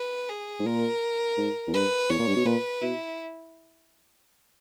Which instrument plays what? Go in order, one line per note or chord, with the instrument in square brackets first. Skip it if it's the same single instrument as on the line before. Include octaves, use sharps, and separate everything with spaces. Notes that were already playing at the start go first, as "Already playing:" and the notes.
Already playing: [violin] B4
G#4
[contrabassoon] G#2
[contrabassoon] A#2 [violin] A#4
[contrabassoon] G#2
E2
[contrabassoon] G2 [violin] B4
[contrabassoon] E2 [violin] C#5
[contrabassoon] A#2
G2
B2
[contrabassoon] A#2 [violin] B4
[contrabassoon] B2 [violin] E4